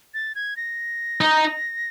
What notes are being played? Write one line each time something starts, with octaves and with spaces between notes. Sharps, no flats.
A6
G#6
A#6
D#4